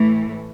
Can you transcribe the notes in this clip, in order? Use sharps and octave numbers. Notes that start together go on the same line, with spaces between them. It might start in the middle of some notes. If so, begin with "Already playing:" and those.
Already playing: A2 E3 A3